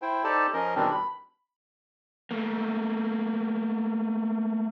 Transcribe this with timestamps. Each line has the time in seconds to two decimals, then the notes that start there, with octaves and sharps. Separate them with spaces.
0.02 E4 C5 G5
0.24 D#4 G4 A4 C5 D5 A5
0.54 F3 C#4 A#4 D#5
0.75 E2 B2 D#3 G3 C4 D4
0.91 B5
2.31 A3 A#3